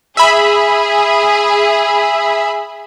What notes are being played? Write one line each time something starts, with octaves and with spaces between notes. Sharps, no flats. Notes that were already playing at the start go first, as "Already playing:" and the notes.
G#4 E5 B5